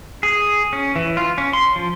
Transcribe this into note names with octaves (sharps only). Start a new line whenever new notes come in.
G#4
C#4
E3
F4
C#4
C6
F3